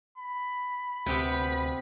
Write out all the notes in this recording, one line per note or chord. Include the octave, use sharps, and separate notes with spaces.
B5
D2 C3 B3 G4 B4 B6